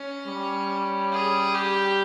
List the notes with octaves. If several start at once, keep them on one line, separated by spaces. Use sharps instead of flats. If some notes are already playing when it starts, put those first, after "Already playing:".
Already playing: C#4
G3
G#4
G4